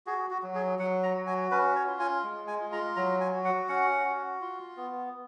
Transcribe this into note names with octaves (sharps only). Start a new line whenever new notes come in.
F#4 G#4
F#4
F#3
G#4
F#3 F#5
A#5
F#4
G#5
C#4 B4
C#5
F4
G#5
G#3
G#5
F4
A#5
F#3 A#5
G#5
F#4
F#5
C#4 F#5
F#4
F4
B3